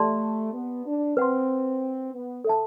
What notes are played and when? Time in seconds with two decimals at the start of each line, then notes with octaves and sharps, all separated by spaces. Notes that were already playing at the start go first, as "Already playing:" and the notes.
Already playing: A3 G4 D5 A5 C6
0.53 B3
0.86 D4
1.17 C4 B4 F#5 C6
2.13 B3
2.44 A4 E5 A5